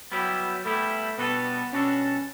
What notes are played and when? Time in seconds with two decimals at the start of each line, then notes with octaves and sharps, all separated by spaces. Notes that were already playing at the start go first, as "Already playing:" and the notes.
0.12 F#3 G3 B3 E4 G4
0.65 G3 A3 B3 E4 G4
1.18 B2 G3 B3 D4 F#4 A4
1.73 B2 G3 C#4 D4 F#4 A4